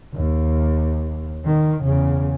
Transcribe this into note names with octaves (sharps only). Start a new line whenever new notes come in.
D#2
D#3
E2 C#3